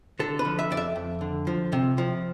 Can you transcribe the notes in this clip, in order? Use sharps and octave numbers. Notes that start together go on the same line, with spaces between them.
D3 A4
B4
F3
E5
F2 D5
E5
F2
D3
F3
C3
F3